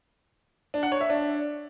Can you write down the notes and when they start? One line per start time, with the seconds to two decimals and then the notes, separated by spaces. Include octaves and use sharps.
0.74 D4
0.83 F#5
0.92 C#5
1.01 E5
1.10 D4